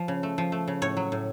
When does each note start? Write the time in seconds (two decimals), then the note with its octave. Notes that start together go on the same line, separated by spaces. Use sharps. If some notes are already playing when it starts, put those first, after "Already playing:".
Already playing: F3
0.08 C#3
0.23 A3
0.38 F3
0.52 A3
0.68 C#3
0.82 A2 C#5
0.97 F#3
1.12 A2